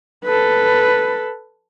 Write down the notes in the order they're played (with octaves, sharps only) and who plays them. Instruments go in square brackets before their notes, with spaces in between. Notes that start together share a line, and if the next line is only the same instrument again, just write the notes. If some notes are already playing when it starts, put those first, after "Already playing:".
[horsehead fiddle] A4 B4